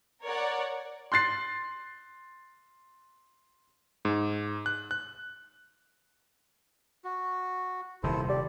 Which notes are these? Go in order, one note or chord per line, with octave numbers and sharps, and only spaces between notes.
A#4 C#5 D5 F#5
C6 F#6 A6 C7
G#2
F#6
F#6
F#4
D#1 C3 D#3 E4 A4 C5
G3 D5